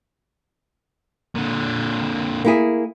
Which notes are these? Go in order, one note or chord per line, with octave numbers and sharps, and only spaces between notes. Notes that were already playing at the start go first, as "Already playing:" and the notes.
A#2 D3
A#3 E4 G#4